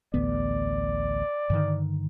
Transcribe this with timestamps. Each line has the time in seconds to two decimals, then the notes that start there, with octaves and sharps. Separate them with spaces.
0.14 A1 D2 B3 D5
1.50 G2 D3 D#3